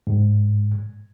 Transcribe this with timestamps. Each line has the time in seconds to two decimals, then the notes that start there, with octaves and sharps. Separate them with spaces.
0.07 G#2